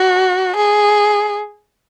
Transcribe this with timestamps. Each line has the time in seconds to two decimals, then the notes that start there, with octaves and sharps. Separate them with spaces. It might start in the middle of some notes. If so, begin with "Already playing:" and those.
Already playing: F#4
0.56 G#4